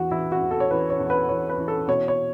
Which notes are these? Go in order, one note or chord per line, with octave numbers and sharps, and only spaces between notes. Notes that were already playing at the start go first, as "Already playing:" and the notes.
Already playing: E2 E3 F#4
E3 E4
F#4
E2
A4
C#5
E3 B4
C#5
E2
B4
E3 C#5
B4
E3
A4
B2 C#5
C#5